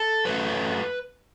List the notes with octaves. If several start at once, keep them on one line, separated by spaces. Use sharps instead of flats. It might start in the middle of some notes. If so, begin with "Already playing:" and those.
Already playing: A4
F#2 F#3 A3 B4